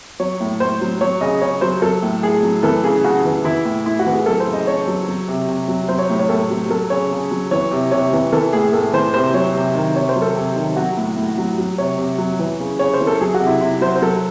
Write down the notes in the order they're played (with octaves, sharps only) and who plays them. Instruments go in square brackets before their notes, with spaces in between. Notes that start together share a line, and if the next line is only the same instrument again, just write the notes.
[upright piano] F#3 C#5
A2
A2 C5
F#3
F#3 C#5
C#3 D#5
C#3 C#5
F#3 C5
F#3 A4
A2
A2 G#4
F#3
E3 A4
C#3 G#4
C#3 F#4
E3
E3 E4
A2
A2 E4
F#4
E3
G#4
F#3 A4
C5
C#3
D#5
C#3 C#5
F#3
F#3
C3
C3
F#3
F#3 C5
C#5
A2
C#5
A2 A4
F#3
F#3 A4
C#3 C#5
C#3
F#3
E3 C#5
C3
C3 C#5
E3
E3 A4
A2 G#4
A2 A4
E3 C5
C3 C5
F#3 C#5
C3
D#3
C3 C#5
C5
F#3
A4
C3
D#3
F#3 F#4
A2
A2
F#3
F#3
C3 C#5
C3
F#3
E3
C#3
C#3 C#5
C5
E3
A4
F#3 G#4
F#4
C3
E4
C3 E4
F#3 C5
C5
F#3 A4